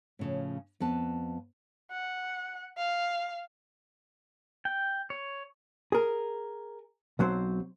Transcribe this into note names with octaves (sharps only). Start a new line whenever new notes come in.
A2 C#3 F3
F2 B3 A5
F#5
F5
G5
C#5
G#4 A#4
B1 F#3 C4 C5